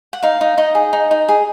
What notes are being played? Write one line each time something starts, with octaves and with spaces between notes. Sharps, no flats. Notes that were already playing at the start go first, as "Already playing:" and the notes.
F#5
D#4 F5
D#4
D#4 D#5
G#4
D#4
D#4
G#4